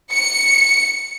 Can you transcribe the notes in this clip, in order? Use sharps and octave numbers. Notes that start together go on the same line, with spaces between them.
C#7